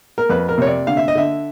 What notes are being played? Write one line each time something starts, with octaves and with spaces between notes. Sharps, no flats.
A#4
F2 B4
A#4
C3 C#5
D5
D3 F5
E5
D#5
D3 E5